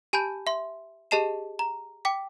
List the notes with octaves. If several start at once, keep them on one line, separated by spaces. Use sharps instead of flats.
G4 G#5 A5 B5 G6
E5 C6
G4 G#4 D#5 A5 C7 E7
A#5
G5 D6 B6